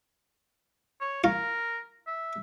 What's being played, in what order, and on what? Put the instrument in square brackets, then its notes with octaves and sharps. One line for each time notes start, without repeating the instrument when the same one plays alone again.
[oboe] C#5
[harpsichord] F4 [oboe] A#4
[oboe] E5